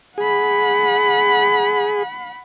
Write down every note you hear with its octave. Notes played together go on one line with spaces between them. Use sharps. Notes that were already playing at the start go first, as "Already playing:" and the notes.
G#4 F#5 B5